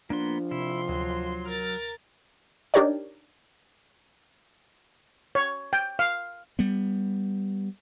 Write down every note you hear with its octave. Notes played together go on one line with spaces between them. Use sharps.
F3 A#3 B3 D4 C6
C3 E4 C6
D2 F#3
A#4 F6 A6
D4 D#4 G4 A#4 C#5 D5
C#5
G5
F5
G3 B3